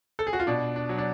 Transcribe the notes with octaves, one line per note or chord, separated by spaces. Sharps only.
A4
G#4
F#4
F4
B2 D4
D4
F#3
D4